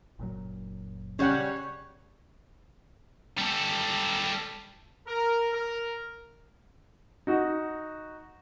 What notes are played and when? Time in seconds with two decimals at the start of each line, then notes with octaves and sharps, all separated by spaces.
0.19 F#1 A#2 F#3
1.19 C#3 G3 C#4 C#5 F#5
3.38 G3 A4
5.07 A#4
5.53 A#4
7.27 D#4 F#4